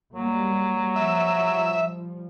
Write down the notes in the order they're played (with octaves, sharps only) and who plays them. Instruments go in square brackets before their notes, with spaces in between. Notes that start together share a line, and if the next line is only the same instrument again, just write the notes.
[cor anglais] F#3 [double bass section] G3 A#3
[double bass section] F3 G3 [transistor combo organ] E5